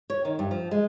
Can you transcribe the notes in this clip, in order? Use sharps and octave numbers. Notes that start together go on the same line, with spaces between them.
C#5
D#3
G2
F3
G#3